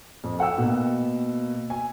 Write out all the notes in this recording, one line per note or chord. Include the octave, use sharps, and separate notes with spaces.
F2
A4 F#5 G5 E6
B2 A#3
G#5